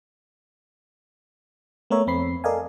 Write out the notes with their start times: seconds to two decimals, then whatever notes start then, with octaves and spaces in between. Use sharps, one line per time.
1.90 A3 B3 A#4 C#5 E5
2.07 F2 C4 B5 C7
2.44 A4 A#4 D5 D#5 F5 G#5